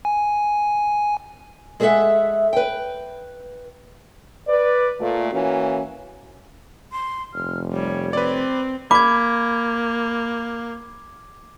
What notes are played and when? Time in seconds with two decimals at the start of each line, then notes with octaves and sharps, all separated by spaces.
0.05 G#5
1.80 G#3 G#4 A4 D5 E5 F#5
2.53 B4 G5
4.47 B4 D5
5.00 A#2 A3
5.31 E3 A#3 C#4 F#4
6.92 C6
7.34 F1 F6
7.73 G3 C#5
8.13 C4 B4 D5
8.91 A#3 B5 D6 G#6